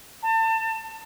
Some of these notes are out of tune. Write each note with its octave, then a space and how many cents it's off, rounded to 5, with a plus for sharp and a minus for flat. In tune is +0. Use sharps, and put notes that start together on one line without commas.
A5 +30